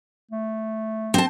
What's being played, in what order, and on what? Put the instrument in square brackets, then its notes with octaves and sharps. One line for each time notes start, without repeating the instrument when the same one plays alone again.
[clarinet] A3
[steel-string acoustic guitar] C4 A5